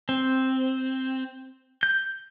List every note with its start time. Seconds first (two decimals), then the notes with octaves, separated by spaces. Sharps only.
0.09 C4
1.83 G6